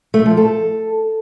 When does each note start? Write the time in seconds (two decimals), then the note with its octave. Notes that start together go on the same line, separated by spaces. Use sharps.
0.14 A3
0.26 F3
0.37 A4